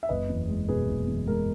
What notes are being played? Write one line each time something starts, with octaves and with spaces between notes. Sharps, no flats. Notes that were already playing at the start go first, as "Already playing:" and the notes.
E5
F#1 B4 D#5
E2
G#3
B2 G#4 B4
F#1
E2
G#3 A#4